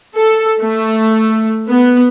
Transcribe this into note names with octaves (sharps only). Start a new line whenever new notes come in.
A4
A3
B3